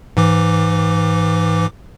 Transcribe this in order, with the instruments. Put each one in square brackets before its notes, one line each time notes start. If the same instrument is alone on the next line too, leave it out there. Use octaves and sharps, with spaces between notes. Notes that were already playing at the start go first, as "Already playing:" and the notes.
[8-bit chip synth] G#2 E3 D6